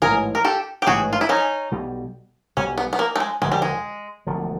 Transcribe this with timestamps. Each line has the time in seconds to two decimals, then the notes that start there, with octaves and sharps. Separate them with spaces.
0.02 A1 G#2 E3 G#4 A#4
0.35 A#4
0.45 G4 A4
0.82 G4
0.87 A1 G#2 E3 F#4 G#4
1.13 F4
1.21 E4
1.29 C#4 D#4
1.71 B1 B2 G3
2.57 B1 B2 G3 C#4
2.78 B3
2.93 B3
2.99 A#3
3.16 A3
3.20 G#3
3.42 E1 D2 D3 F3 G#3
3.52 G3
3.62 G#3
4.27 E1 D2 D3 F3